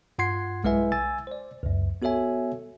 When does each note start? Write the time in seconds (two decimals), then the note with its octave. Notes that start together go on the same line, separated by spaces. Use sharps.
0.18 G2 F4 F#5 C6 G#6 C7
0.64 B1 G#3 E4 B4 E5 G#5
0.92 G#5 E6 A6
1.27 C5 D5
1.63 C#2 F#2
2.02 B3 F#4 A4 C#5 E5 G#5